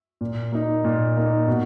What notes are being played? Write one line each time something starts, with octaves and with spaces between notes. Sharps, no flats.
A#2
A#3 D#4
A#2
A#3 D#4
B2